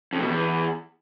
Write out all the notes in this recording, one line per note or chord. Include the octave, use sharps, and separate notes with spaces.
F2
B2
E2